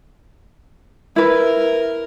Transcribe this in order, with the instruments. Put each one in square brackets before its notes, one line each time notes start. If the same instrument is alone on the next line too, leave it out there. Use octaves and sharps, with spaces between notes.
[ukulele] E4 B4 [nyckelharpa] A#4